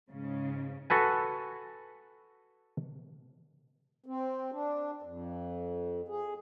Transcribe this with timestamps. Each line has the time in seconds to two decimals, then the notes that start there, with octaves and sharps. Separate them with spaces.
0.11 G#2 C#3
0.90 F#4 A4 B4 G#5
4.06 C4
4.52 D4
5.02 F2
6.08 G#4